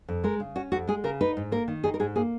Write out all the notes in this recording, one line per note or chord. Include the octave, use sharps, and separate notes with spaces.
F2
G#3 A#4
C#3
C#4 F#4
F2 F#4
G#3 G#4
C#3 A#4
D#4 B4
G#2
A#3 A#4
D#3
D#4 G#4
A#4
G#2 G#4
A#3 G#4